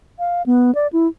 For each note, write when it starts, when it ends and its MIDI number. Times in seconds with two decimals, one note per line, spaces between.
0.19 0.42 77
0.46 0.74 59
0.75 0.87 74
0.93 1.07 64